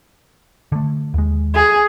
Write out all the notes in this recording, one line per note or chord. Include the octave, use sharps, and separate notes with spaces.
D3 A3
D#2 G#3
G#4